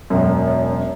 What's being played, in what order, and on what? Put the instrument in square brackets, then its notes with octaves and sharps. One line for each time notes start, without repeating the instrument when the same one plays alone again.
[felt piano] E1 F#2